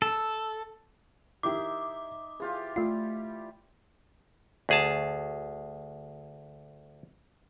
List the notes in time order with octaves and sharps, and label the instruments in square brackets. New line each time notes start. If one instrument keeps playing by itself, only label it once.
[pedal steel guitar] A4
[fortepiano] D#3 E4 G4 [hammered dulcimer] D#4 E5 [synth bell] D6
[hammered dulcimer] E3 F4 G4 [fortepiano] G#4
[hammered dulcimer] G3 [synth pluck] A3 F4
[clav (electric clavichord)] D2 G#4 A5